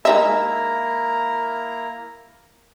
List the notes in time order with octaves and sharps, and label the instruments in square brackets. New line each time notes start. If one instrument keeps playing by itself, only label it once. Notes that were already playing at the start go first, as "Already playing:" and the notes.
[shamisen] G#3 D#4 E5 [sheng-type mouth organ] A#3 E4 A#5